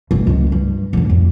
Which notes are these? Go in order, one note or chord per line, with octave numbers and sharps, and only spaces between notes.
G1
C#2 F#3
G2
G#2 D3
F2